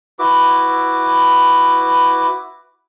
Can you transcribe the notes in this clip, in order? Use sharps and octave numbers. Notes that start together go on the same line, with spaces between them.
E4 F#4 B4 D6